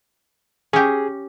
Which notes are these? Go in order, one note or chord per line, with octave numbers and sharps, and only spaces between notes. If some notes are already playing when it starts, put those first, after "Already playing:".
C#4 G4 G#4